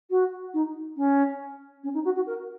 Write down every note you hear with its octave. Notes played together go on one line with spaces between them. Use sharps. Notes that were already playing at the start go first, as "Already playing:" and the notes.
F#4
D#4
C#4
C#4
D#4
F#4
F#4
A#4